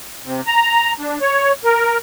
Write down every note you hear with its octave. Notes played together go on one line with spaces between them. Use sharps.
C3
A#5
D4
C#5
A#4